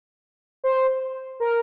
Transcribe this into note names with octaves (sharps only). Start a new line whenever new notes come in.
C5
A#4